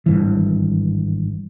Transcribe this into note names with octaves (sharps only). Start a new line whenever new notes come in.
G#1 G2 E3